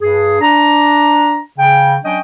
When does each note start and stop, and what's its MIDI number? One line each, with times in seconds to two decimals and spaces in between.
0.01 0.38 43
0.01 0.38 68
0.41 1.40 62
0.41 1.40 82
1.59 1.96 49
1.59 1.96 79
2.04 2.19 54
2.04 2.19 61
2.04 2.19 62
2.04 2.19 75
2.04 2.19 79